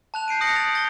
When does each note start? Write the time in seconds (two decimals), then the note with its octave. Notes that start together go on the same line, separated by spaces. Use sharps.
0.14 A5 F#6 F7
0.28 G6 C7 D7 D#7
0.41 D#6 F#6 A#6 C#7 F#7
0.56 D#6 A6 D7 F7
0.73 G6 A6 G7